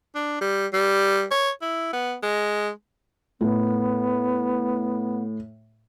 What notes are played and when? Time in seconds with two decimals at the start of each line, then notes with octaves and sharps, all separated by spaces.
0.15 D4
0.41 G3
0.73 G3
1.31 C#5
1.62 E4
1.93 B3
2.23 G#3
3.41 A2 B3